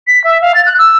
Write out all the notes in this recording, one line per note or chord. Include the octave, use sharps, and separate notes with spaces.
B6
E5
F5
A6
F#6
E6